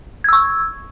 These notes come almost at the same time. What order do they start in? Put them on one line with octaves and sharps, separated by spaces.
G#6 E6 C#6